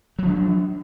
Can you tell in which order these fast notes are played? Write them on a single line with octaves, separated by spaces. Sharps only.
F#3 F3 D4